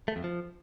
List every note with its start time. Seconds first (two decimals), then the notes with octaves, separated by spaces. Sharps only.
0.08 A3
0.16 F2
0.24 F3